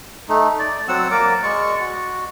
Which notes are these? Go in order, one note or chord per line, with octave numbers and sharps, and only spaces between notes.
A3 D#4
D5
F#3 C4 F#5 E6
A#3 A#4 D5 D6
G#3 D5 C#6
F#4